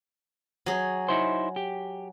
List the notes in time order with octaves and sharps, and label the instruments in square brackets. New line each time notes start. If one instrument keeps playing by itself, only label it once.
[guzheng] F#3 G#4
[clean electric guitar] D#4 E4 C5
G4